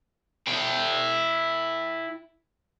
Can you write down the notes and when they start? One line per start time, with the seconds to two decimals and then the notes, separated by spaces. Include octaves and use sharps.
0.47 E4 G5